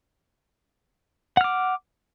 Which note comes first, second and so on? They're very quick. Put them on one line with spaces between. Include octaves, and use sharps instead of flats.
F#5 F6 D6